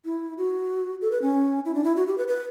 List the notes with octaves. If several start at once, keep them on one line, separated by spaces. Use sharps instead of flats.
E4
F#4
A4
B4
C#4
E4
D4
E4
F#4
G4
B4
B4